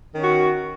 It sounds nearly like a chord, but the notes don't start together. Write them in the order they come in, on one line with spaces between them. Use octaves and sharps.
D#3 C#4 F#4